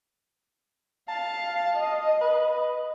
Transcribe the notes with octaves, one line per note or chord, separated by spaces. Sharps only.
F5 A5
D#5
B4